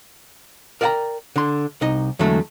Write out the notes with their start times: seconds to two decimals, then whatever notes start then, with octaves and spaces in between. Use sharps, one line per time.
0.81 A#4 D5 D#5 F#5 G5 A#5
1.36 D3 C6
1.81 C2 D#4 D#5
2.19 E2 D3 F#3 G#3 A3